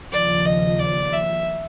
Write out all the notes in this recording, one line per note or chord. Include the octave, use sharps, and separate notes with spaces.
D#2 C#3 F3 D5
D#5
D5
E5